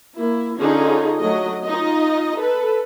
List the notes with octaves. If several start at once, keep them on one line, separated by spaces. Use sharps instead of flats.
A#3 E4
D3 C#4 D#4 F4 G#4
F#3 A3 D#5
D#4 F4 D#5
A4 B4